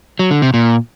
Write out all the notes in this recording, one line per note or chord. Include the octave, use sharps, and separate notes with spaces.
F#3
D3
C3
A#2